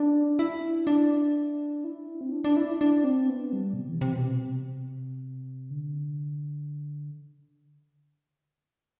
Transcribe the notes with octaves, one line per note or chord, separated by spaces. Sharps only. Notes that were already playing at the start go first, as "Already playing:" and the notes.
Already playing: D4
E4
D4
E4
C4
D4
D4
E4
D4
C4
B3
G3
B2
C3
E3
C3
B2
C3
D3